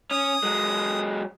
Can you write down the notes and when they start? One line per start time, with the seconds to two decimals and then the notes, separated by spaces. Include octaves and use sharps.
0.11 C#4 D#6
0.43 F#3 G#3